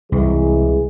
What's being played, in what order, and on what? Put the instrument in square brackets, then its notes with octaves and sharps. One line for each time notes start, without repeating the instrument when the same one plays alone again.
[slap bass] C2 [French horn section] E3 G#3 G#4